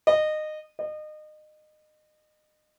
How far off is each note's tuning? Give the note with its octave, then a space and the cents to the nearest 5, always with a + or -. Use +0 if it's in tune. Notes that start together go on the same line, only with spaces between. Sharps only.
D#5 -20
D#5 -30